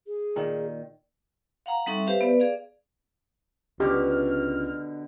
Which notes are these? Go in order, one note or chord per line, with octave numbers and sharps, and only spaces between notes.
G#4
A#2 D#3
F5 F#5 A#5
G3 C4 D#4 A4 E5 C#6
G4 B4 C5 E5 F5
B3 B4 D5
G#4 D5 F5
C#2 B2 D3 G4 F6